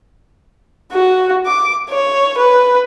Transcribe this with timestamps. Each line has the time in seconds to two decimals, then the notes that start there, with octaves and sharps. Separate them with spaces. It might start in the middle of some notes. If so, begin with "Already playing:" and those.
0.92 F#4
1.46 D6
1.89 C#5
2.38 B4